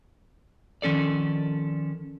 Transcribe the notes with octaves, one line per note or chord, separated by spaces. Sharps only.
D#3 F3 C#4 A4 D5